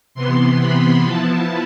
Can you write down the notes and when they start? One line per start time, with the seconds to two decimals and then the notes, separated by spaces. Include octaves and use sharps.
0.15 C3 E3 B3 C6
0.61 B5
1.06 F3 B3 E4 A5